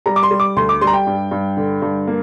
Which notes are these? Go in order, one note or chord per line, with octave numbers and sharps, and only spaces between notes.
G3 A#5
D6
C6
G3
D6
D2 C6
D6
G3 C6
A#5
G5
G2
G2
D3
G2
A#3